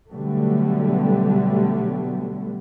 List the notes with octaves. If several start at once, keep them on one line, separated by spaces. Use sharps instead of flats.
B2 D3 F#3 G3 A3 B3